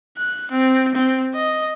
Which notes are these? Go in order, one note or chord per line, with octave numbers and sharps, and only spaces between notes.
F#6
C4
C4
D#5